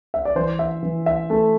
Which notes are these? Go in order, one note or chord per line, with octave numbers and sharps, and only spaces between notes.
E5
D5
E3 C5
E5
E3
E5
A3